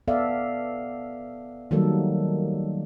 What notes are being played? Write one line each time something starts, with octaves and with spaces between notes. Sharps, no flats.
B3 A4 D5 E5 F5
D#3 F#3 G3 A#3 A4